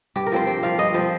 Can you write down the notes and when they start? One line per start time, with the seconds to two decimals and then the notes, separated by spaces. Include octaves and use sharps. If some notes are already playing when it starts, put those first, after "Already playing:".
0.16 G2 G4
0.26 A#4
0.32 F3 C4 C5
0.47 G2 G5
0.63 F3 C4 F5
0.78 G2 D#5
0.94 F3 C4 C5